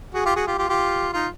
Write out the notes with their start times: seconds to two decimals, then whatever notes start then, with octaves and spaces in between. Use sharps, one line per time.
0.14 F#4 G#4
0.25 F4 G4
0.36 F#4 G#4
0.47 F4 G4
0.58 F4 G4
0.69 F4 G4
1.13 D#4 F4